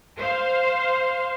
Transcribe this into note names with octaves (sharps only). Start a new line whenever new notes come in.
C5 F5